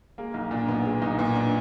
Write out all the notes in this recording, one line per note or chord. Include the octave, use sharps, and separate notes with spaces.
G#3 A#3
B1
A#2 D4
B1 B3
G#3
B1 D#4
A#2 B3
D4